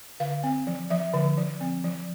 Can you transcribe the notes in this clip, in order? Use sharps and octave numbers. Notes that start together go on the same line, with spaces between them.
D3 F5
C4
F3
F3 E5
D3
F3
C4
F3